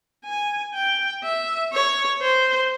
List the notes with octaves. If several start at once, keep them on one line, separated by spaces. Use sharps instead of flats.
G#5
G5
E5
C#5
C5